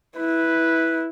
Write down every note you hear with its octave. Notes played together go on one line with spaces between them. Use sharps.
E4 B4